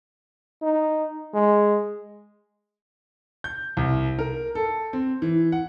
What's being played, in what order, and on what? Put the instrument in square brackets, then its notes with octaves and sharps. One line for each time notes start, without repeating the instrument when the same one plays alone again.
[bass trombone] D#4
G#3
[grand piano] G6
C2
A#4
A4
C4
E3
F#5